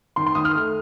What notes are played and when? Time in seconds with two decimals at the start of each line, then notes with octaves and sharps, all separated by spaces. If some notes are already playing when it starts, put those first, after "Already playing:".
0.16 D#3 C6
0.26 C6
0.35 D#3 D#6
0.45 F6
0.55 A3